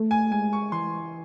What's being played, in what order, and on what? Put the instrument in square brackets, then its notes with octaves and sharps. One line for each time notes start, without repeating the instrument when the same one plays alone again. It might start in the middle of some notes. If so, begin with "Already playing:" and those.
Already playing: [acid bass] A3
[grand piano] G#5
[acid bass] G#3 [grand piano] G#5
[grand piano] C#6
[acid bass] E3 [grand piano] C6